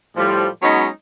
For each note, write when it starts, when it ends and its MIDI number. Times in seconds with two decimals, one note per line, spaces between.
0.17 0.48 45
0.17 0.48 53
0.17 0.48 55
0.62 0.88 54
0.62 0.88 56
0.62 0.88 59
0.62 0.88 61
0.62 0.88 63
0.62 0.88 73